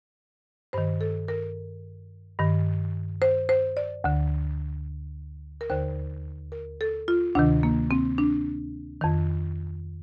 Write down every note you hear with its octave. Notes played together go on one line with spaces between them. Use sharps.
G2 D#3 C5
A4
A#4
G2 D#3
C5
C5
D5
D2 D3
A#4
D#2 D3 C5
A#4
A4
F4
D2 C3 D#3 D4
A#3
C4
D4
F2 D#3